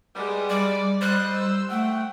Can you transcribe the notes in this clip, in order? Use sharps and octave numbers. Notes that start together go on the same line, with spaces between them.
G3 G#3 B3
G3 D5
G3 C5 D#5 F#6
E6
A3 F#5 G5